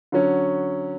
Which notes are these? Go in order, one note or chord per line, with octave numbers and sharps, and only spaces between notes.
D3 F#3 C#4